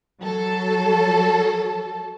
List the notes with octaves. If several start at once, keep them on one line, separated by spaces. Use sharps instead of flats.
F#3 A4